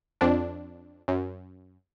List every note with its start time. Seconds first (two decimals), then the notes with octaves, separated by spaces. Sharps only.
0.21 F2 D4
1.08 F#2